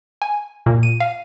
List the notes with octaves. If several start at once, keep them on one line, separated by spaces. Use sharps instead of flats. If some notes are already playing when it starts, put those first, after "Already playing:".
G#5
A#2
D#7
F5